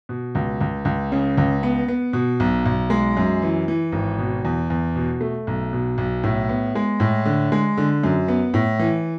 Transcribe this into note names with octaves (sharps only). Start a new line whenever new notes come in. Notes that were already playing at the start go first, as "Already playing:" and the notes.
B2
C#2
C#2
C#2
C#3
C#2
B3
B3
B2
B1
B1
G#3
F#2
E3
E3
G#1
B2
E2
E2
B2
A3
B1
B2
B1
A2
B3
G#3
A2
D3
G#3
D3
F#2
B3
A2
E3